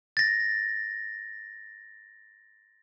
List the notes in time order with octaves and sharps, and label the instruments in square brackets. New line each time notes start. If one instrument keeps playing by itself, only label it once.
[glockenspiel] A6 A#6